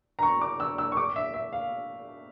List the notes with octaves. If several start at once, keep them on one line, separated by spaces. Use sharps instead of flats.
A#5
C#6
D6
E6
E6
C#6
D6
E5
E5
F5